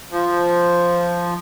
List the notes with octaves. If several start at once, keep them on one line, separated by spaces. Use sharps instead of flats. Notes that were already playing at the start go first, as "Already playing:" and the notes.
F3